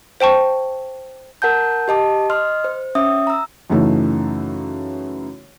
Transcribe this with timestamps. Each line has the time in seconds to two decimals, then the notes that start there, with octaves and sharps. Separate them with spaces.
0.20 C5 G5 A5 C#6
1.42 A#4 F#5 A5 G6
1.88 G4 D#5 A5 D6
2.30 D#5 C6 F6
2.64 C5
2.95 C#4 E5 D#6
3.27 A#5 E6
3.70 F#2 C#3 E3 A3 D#4